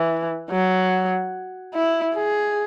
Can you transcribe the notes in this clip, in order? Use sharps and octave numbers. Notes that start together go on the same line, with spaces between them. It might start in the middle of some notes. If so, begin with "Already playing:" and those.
Already playing: E3
F#3
E4
G#4